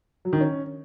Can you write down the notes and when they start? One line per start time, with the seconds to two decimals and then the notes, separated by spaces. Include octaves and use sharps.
0.25 F#3
0.33 D#3
0.40 C#4